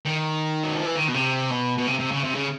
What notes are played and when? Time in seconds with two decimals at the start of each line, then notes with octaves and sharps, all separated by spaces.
0.05 D#3
0.64 F#3
0.75 F3
0.85 E3
0.96 D#3
1.08 B2
1.14 C3
1.50 B2
1.78 B2
1.87 C3
1.99 C3
2.11 C#3
2.24 C3
2.35 C#3